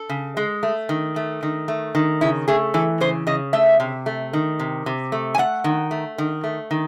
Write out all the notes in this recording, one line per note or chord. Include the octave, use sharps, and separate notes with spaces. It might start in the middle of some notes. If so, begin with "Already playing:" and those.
Already playing: A4
C#3
G#3
A3
D#3
A3
D#3
A3
D#3
C#3 E4
A3 G#4
E3 A4
C#3 C5
C#3 D#5
A3 E5
C3
A3
D#3
C3
C3
A3
G#5
A3 F#5
D#3
A3
D#3
A3
D#3